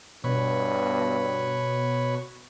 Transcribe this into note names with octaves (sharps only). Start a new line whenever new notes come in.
G2 B2 B4 C#5